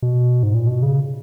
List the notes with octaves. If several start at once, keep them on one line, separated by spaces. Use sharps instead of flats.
B2
G#2
A#2
B2
C#3